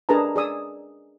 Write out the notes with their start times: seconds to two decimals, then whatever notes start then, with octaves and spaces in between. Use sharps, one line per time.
0.09 D4 G#4 A#4 B4 A5 A#5
0.36 G#4 D5 D#6 E6